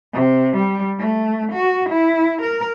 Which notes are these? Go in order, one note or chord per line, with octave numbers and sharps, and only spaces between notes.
C3
G3
A3
F#4
E4
A#4